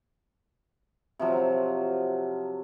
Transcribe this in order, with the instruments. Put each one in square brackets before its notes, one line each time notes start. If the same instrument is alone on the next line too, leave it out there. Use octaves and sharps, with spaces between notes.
[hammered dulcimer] C3 F3 F#3